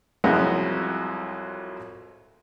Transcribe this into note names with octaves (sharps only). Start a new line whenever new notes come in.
C2 F2 F#3 G#3 E4 F#4